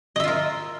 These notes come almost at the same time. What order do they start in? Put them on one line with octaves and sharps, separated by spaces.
D#5 E5 F4 A#4